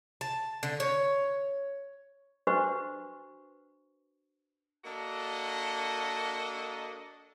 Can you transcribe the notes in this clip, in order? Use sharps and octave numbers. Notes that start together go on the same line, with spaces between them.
A5
D3
C#5
D4 F#4 B4 C5 D#5 C#6
A#3 D4 F#4 A4 D#5